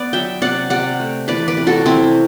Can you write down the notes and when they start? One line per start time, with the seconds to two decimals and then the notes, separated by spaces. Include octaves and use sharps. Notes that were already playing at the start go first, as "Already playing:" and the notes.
Already playing: B3 B4 D5
0.13 F#3 E5 G5
0.42 C3 D5 F#5
0.70 C3 D5 F#5
1.00 A3
1.28 E3 B4 D5
1.48 B4 D5
1.57 C3
1.67 F#4 A4
1.85 C3 C4 E4